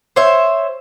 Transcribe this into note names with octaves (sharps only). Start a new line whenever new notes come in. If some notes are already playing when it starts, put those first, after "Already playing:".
C5 C#5 E5